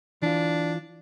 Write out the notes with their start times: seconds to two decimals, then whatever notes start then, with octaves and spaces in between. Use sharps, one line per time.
0.22 E3 D4 F4